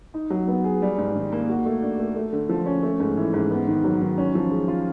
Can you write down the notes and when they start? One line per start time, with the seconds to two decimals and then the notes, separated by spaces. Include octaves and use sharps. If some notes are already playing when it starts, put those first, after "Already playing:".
0.14 D#4
0.30 F#3
0.48 B3
0.64 G#4
0.82 G3
0.98 G#2
1.16 D#3
1.32 A#3
1.49 F#4
1.66 A3
1.82 D4
1.99 A3
2.16 A3
2.33 D3
2.49 F3
2.66 C#4
2.83 A3
3.00 G#2
3.17 E3
3.33 G#2
3.51 B3
3.67 D#3
3.84 F#3
4.01 D#3
4.18 C#4
4.35 F3
4.51 G#3
4.68 F4